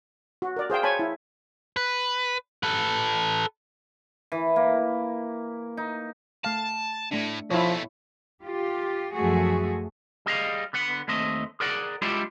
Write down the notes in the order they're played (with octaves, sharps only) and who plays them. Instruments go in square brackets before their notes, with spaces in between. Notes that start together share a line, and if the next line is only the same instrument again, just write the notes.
[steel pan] F#4
A#4 D5
G#4 C5 F5 G5
C#5 G#5 A5 B5
E4
[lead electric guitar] B4
A4 B4
[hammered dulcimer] E3
A#3
D#4
[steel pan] A3 F5 [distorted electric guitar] A5
[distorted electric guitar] A2 [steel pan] A3 D4
[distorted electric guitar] B2 A3 [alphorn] F3 [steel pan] E4 C#5
[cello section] F4 G4
F#2 F3 A3 F#4 G#4
[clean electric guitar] G3 G#4 D#5 F5
D3 B3 F#5
D#2 A3 C4 D#5
G#4 A#4 D5 F#5
G3 G#3 D4 E4 F4 G4